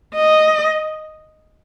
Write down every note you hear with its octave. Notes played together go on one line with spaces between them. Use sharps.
D#5